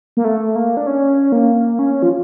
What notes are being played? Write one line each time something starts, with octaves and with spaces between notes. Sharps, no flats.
A#3
A3
A#3
D4
C#4
A#3
C#4
F3